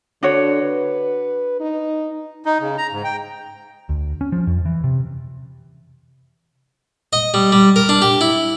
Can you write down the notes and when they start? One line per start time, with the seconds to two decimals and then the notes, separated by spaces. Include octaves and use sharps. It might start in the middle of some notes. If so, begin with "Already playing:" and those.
0.23 D3 D4 F#4 C#5
0.62 B4
1.60 D#4
2.45 D#4
2.60 C#3
2.78 A#5
2.92 G#2
3.04 G5
3.89 D2
4.21 C#4
4.32 F3
4.47 F2
4.65 E3
4.84 C3
7.13 D#5
7.34 G3
7.52 G3
7.76 A#4
7.89 D4
8.02 G4
8.21 E4